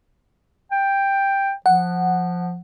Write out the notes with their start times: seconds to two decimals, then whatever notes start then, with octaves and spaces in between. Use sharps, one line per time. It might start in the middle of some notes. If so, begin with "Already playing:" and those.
0.71 G5
1.66 F3 F#5